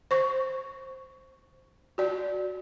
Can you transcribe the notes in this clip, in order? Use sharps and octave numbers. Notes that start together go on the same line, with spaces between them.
C5 C#6
F#4 D5